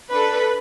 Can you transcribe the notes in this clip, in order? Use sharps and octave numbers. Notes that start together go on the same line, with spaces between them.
D4 A4 B4